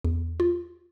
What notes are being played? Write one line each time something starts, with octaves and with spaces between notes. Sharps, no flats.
E2
F4